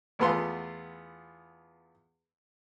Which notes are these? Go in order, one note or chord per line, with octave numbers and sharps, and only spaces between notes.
E2 A3 B3 F4 C6